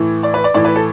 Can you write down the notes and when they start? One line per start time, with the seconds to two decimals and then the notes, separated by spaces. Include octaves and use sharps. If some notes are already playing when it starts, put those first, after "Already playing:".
Already playing: A2 E3
0.23 D5
0.34 B4
0.44 D5
0.54 A2 E3 D5
0.65 B4
0.76 A4